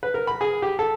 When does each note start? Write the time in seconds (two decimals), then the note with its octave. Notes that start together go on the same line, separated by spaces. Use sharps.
0.03 B4
0.14 A#4
0.27 B5
0.41 G#4
0.62 G4
0.79 A4